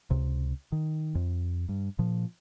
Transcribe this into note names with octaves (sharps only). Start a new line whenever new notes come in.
C#2 C3
D#3
F2
G2
A#2 F3